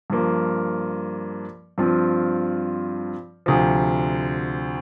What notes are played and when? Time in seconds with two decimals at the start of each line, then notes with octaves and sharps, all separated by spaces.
0.10 G2 F3 A#3
1.78 G2 F3 C4 F4
3.46 D2 C3 F3